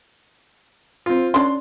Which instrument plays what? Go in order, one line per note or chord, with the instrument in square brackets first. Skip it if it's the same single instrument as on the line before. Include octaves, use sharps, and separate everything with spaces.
[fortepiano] C4 F4
[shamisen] C#4 D4 [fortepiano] C6